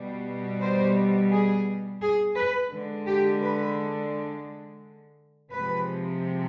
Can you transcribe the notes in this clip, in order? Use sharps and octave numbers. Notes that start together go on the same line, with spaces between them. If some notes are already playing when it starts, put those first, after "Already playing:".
Already playing: B2 G3
C5
G#4
G#4
B4
D3 G#3
G4
B4
C3 F3 G#3 B4